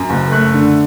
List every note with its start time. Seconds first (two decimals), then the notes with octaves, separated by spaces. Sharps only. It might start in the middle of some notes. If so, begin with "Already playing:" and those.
Already playing: F#2
0.10 F#1
0.32 A3 F#6
0.54 D3